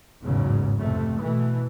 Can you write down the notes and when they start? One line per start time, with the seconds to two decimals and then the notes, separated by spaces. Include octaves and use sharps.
0.23 A1 E2 G#2 C#3 F#3
0.79 F2 C3 A3
1.20 B2 E3 A3